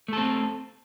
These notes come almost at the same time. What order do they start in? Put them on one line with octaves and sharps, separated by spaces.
A3 A4 C4